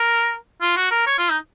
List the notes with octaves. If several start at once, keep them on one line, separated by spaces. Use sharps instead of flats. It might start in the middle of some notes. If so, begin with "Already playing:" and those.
Already playing: A#4
F4
F#4
A#4
C#5
F4
D#4